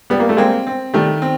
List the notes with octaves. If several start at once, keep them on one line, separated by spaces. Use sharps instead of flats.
G3 B3
A#3
A3
G#3 A#3 C4
C4
D#3 G3 A3
C4